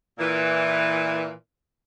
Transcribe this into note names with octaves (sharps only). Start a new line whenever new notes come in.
A#2 E3